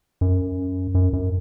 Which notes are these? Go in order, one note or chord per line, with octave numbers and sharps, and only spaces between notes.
F#2
F#2
F#2